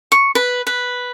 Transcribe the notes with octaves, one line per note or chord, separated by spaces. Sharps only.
C#6
B4
B4